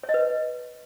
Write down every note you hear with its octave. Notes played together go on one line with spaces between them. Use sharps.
C#5
D#5
B4